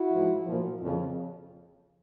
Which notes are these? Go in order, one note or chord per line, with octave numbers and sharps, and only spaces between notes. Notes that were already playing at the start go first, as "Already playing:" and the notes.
Already playing: E4 F#4
G#2 F3
A#2 F3
F2 C#3 F3